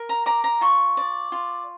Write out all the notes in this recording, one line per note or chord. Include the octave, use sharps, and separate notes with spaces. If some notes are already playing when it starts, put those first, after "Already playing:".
Already playing: A#4
A#5
D5 A#5
A#5
F4 C#6
D5
F4